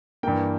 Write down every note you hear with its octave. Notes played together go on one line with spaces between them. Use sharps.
G2 E3 A#3 G5